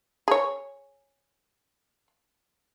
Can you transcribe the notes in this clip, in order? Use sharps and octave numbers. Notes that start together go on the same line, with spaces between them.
G#4 C#5